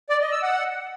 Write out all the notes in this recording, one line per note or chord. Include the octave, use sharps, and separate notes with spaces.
D5
D#5
E6
F#5